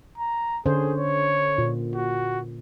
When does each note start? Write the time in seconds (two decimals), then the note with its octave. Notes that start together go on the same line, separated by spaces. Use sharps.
0.18 A#5
0.66 D3 C#4 G#4 C5
0.98 C#5
1.58 A#2
1.95 F#4